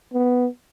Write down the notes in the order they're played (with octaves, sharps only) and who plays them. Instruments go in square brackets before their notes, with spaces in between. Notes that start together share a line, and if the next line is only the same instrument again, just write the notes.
[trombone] B3